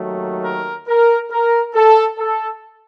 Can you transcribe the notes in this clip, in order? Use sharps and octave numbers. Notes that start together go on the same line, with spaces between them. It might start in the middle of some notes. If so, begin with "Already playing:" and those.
Already playing: D#2 D#3 F#3 A3
A#4
A#4
A#4
A4
A4